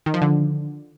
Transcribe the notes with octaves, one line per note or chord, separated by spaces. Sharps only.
D#3
F3
D3